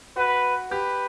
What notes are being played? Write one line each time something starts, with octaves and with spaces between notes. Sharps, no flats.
F#4 B4
G4 B4